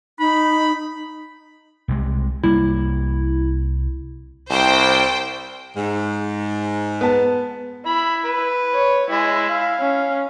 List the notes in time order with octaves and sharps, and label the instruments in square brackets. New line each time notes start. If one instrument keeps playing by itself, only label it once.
[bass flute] D#4 [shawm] B5
[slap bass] C2 C3 G#3
[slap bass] C2 G3 A#3 [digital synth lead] E4
[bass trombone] C2 [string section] C5 G5
[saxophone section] G#2
[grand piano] B3 A5
[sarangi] E4 [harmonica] B5
[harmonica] B4
[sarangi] C#5
[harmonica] G#3 [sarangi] E4
[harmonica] F5
[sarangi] C#4